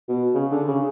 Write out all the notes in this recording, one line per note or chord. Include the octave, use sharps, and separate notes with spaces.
B2
C#3
D3
C#3